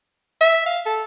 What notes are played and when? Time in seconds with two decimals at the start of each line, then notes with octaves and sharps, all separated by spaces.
0.41 E5
0.66 F5
0.86 A4